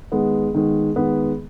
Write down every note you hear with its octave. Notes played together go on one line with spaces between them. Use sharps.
D#3 G#3 B3
D#3 G#3 B3
D#3 G#3 B3